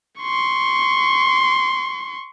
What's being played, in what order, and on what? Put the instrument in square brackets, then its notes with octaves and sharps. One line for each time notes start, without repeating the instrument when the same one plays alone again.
[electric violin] C6 C#6